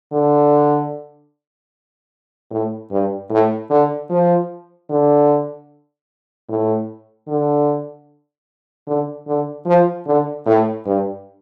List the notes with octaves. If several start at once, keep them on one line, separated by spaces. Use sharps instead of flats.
D3
A2
G2
A2
D3
F3
D3
A2
D3
D3
D3
F3
D3
A2
G2